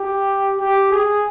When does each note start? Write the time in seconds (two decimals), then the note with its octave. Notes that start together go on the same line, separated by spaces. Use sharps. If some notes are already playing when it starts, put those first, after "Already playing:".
Already playing: G4
0.61 G4
0.92 G#4